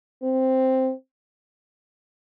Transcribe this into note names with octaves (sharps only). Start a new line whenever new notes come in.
C4